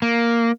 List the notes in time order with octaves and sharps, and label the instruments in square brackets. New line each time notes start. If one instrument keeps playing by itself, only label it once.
[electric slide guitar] A#3